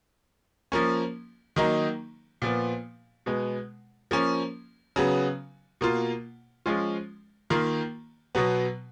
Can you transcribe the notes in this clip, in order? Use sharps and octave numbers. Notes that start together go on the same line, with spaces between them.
F3 A#3 C#4
D#3 F#3 A#3 D#4
A#2 F3 B3
B2 G#3 B3
F3 A#3 C#4
C#3 F#3 B3
B2 A#3 F4
F3 G#3 C#4 F4
D#3 A#3 F4
B2 F#3 B3